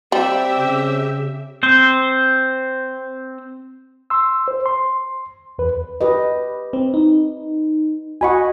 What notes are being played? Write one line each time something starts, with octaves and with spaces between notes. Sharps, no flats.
G3 C4 G4 E5
C#3
C4 C5
C6 E6
C5
C6
E2 B4
G4 B4 D#5
C4
D#4
F#4 D#5 F#5 G#5 B5 C#6